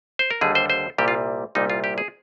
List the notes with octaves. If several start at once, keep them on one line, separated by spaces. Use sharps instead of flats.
C5
A#4
D#2 D3 G3 G#4
C5
C5
C2 A#2 G3 G4
F4
C2 A#2 G3 D#4
F4
G4
G#4